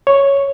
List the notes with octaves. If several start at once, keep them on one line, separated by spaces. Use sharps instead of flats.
C#5